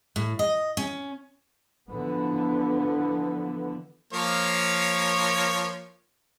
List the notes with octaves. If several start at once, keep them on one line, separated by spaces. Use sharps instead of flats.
A2
D#5
C#4
D3 E3 F3 B3
F3 A#3 C#5